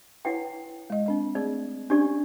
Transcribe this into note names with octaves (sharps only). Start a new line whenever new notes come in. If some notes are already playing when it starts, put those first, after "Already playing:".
E4 B4 C#5 F#5 G5
G#3 D#5
C4 D4 D#5
A3 C4 G#4 D5
C#4 D4 G4 D5